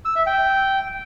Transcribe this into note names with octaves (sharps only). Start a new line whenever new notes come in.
E6
E5
G5